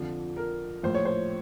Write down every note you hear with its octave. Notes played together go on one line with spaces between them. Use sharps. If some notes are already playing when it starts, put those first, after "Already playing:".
Already playing: F2 D3 F3
A#4
A#1 A2 F3 C5
C#5
C5